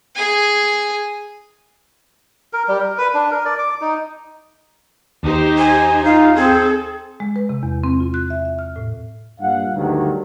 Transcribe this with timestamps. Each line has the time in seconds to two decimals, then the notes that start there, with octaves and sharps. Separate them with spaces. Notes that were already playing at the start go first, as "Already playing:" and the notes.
0.15 G#4 G#5
2.53 A#4
2.68 G3
2.81 A#4
2.98 B4
3.14 D4
3.31 A#4
3.45 D5
3.59 D6
3.81 D#4
5.23 D#2 D#4 G4 C5
5.58 G#5
6.05 D#4 F4 F5
6.36 C4 G#4 A4
7.20 G#3
7.36 B4
7.49 C3
7.63 E2
7.84 C4
8.00 F4
8.14 F#6
8.30 E5
8.45 E5
8.59 F6
8.76 A2
9.41 G2 A#2 F5 F#5
9.75 D2 G2 D3 D#3 F#3